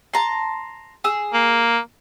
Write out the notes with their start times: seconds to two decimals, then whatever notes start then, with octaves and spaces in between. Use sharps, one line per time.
0.14 A5 A#5 C6
1.04 G#4 E6
1.33 A#3